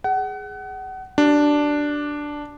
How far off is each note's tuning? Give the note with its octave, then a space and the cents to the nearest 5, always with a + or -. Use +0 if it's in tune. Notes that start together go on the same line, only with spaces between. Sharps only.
G#4 +0 F#5 +30
D4 +0 G4 -40